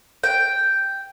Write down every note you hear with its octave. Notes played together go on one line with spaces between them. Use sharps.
G5